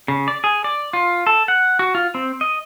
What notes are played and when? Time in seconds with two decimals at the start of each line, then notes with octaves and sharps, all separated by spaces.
0.08 C#3
0.28 D5
0.44 G#4
0.64 D5
0.93 F4
1.27 A4
1.48 F#5
1.79 F#4
1.95 F4
2.15 C4
2.41 D#5